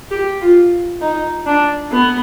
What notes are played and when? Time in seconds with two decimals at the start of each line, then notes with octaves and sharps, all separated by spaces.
0.11 G4
0.41 F4
1.02 D#4
1.47 D4
1.92 B3